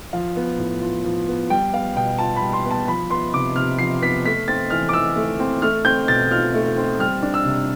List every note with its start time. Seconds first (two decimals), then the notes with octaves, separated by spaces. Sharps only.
0.13 F3 F5
0.36 B3
0.58 A2
0.81 F4
1.04 F3
1.28 B3
1.50 G3 G5
1.73 B3 F5
1.96 B2 G5
2.19 F4 A5
2.36 B5
2.41 G3
2.53 C6
2.65 B3
2.71 A5
2.87 F3 B5
3.10 B3 C6
3.34 C3 D6
3.56 C3 F6
3.79 F3 C7
4.01 B3 B6
4.25 A3 B6
4.48 C4 A6
4.70 E3 F6
4.89 D6
4.93 E3 E6
5.16 A3
5.39 C4
5.62 A3 F6
5.85 C4 G6
6.08 B2 A6
6.31 F4 F6
6.54 A3
6.77 C4
6.99 G3 F6
7.23 D4
7.34 E6
7.45 C3